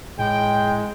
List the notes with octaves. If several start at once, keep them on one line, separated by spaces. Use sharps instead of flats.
A2 G#3 G5